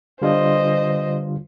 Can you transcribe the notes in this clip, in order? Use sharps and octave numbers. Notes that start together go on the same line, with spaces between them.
D3 G3 F4 C5 D#5